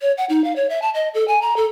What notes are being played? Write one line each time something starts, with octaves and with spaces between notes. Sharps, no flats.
C#5
F#5
D#4
F5
C#5
E5
A5
D#5
A4
G#5
A#5
A4